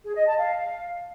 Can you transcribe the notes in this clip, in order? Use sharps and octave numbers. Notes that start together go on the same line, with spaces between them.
G#4
D#5
A5
F5